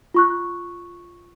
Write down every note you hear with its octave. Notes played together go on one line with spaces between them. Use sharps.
F4 C#6 F#6